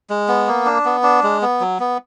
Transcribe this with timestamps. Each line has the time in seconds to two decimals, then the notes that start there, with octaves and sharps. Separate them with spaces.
0.10 G#3
0.28 B3
0.47 A#3
0.66 D4
0.85 B3
1.03 D4
1.23 G#3
1.42 B3
1.60 F#3
1.80 B3